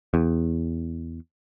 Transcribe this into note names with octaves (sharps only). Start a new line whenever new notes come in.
E2